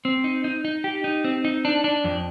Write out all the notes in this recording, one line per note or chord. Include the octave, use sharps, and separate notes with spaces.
C4
D#4
D#4
D#4
G4
D#4
C4
D#4
D4
D4
F2